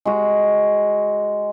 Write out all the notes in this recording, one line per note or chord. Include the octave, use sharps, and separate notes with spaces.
G#3 F#4